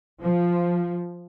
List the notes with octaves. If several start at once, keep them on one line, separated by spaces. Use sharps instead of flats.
F3